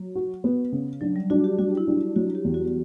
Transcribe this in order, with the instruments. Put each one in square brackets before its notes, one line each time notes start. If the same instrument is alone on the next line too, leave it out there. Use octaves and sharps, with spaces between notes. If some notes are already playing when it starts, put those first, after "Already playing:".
Already playing: [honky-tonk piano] F#3
F#4
B3
C#3
[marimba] F#3 [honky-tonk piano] D4
[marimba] G3
[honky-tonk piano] D4 [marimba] F#4
[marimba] G4
[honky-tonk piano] G3 [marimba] F#4
[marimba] E4
[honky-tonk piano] D4
[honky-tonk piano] F#3 [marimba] F#4
[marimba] G4
[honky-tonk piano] E2
[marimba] F#4